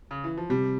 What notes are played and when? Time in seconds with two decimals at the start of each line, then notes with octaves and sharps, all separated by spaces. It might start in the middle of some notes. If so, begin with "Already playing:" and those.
0.11 C#3
0.24 E3
0.38 F3
0.49 C3 G3